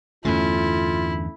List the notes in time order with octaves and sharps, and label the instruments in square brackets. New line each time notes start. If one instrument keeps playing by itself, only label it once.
[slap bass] E2 G2 D3 [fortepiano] A3 C#4 [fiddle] E4 [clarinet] F4